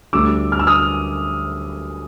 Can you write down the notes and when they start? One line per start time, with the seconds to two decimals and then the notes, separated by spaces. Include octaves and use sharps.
0.13 D2 D3 G3 D6 E6
0.52 F6
0.59 E6
0.67 D#6 F6